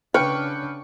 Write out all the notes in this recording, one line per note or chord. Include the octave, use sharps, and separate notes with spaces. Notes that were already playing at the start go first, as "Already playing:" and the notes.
C#3 D4 B4 G5 C#6 F6